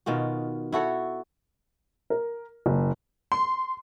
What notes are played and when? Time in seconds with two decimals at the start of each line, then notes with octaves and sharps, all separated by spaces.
0.06 B2 D#3 F4 F#4
0.72 E4 F#4 A4 C#5
2.10 A#4
2.66 F#1
3.32 C6